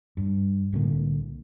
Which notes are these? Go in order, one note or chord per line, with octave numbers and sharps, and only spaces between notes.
G2
C2 A2 D3 A#3